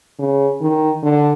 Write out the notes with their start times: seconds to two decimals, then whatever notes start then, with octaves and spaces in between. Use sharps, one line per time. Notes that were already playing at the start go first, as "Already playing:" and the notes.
0.19 C#3
0.61 D#3
1.03 D3